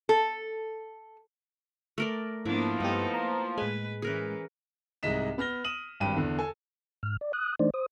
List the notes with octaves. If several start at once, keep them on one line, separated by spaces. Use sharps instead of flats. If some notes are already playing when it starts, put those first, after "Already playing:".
A4
A3 A#4 D5
G#2 F3 A#3 B3 D4 E4
G2 B3 D#4 G4 A4
A#3 A#5
A2 G#3 B4 G#5
E3 C#4 G#4 A#4 B4
C2 G#2 G#3 D#5 B6 E7
B3 F6 A#6 G7
D#6 D#7 E7 F#7
G#1 G2 G5 D#7
E2 D3
A4 G#5
G#2 F6
D5
D#6 F#6
E3 A3 D4 D#4 C5 D5
C5 D#6